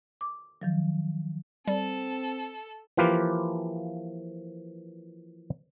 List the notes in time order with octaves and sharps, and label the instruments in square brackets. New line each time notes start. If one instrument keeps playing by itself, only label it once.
[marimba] D6
D#3 F3 F#3
[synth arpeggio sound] G3 [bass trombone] C4 [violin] A4
[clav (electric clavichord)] E3 F3 A#3 F4 G4 B4